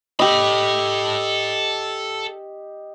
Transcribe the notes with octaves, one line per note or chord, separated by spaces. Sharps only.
G4 A4 D#5 B5